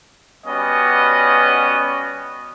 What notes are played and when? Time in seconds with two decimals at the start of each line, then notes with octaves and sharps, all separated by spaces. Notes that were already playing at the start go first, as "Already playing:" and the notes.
0.47 G3 B3 C#4 F#4 C#5 D#5